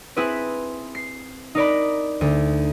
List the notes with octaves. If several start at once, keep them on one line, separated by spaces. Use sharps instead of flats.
C4 E4 G#4 B4
C7
D#4 A#4 D5 B5
D2